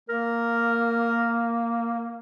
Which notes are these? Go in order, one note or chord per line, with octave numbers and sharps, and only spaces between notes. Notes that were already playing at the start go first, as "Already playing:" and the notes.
A#3 A#4